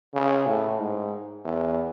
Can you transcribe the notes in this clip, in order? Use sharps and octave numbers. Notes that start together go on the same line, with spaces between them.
C#3
A2
G#2
E2